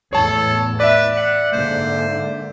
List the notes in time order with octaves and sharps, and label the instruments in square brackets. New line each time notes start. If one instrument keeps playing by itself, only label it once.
[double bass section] E2 A2 [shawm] A4 [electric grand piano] C#5 A5
[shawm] B4 [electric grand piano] D5 E5
[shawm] F#5
[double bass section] G#2 D3 A#3 [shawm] C5